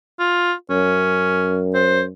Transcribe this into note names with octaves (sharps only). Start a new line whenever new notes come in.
F4
F#2 C#4
C5